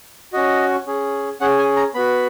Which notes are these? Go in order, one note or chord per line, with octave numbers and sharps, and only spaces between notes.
C#4 F#4 D#5
C#4 G#4
C#4 G#4 F#5
G#5
A#5
B3 F#4 B5